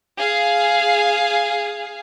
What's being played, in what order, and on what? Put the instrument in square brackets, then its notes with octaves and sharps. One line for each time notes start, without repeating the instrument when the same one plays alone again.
[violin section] G#4 F5